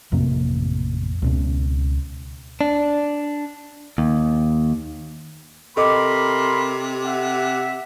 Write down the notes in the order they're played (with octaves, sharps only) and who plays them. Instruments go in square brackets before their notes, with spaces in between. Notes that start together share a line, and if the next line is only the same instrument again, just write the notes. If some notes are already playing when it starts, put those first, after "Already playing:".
[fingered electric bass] A1 F2 C3 A#3
C#2 B2 C#4
[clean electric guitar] D4
D#2
[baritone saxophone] C3 [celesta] A4 D#5 D6 [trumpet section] A#4 B5 C6
[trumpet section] E5 F#5